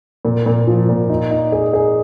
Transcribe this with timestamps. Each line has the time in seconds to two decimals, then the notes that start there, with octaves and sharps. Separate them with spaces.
0.25 A#2
0.46 A#2
0.67 F3
0.89 A#2
1.10 D#4
1.31 D#4
1.52 G#4
1.73 G#4